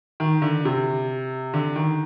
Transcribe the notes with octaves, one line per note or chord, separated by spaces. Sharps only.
D#3
D3
C3
D3
D#3